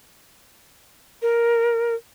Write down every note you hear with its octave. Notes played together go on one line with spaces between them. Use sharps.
A#4